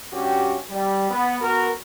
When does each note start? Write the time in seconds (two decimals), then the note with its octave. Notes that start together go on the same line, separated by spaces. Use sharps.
0.13 G2 C#4 F#4 G4
0.70 G3
1.11 B3
1.41 B3 F#4 A#4